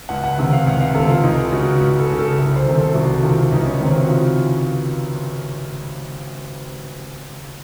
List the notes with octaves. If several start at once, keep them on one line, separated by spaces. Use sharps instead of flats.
C#2 F#5
F#5
C3 D#3 F#5
F5
C#2 F#5
F5
C3 D#3 A4
F4
C#2 D#4
C#3 F#4
C#2
A4
C#3
A4
C2
C5
C3 D#3
A4
C2 F#4
C3 D#3 F4
C#2 D#4
C#4
C3 D#3 C4
F#4
F4